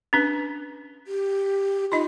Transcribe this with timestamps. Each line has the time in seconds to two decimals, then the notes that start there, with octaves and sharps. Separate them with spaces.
0.13 C#4 D4 B4
1.07 G4
1.92 D#4 F4 D#5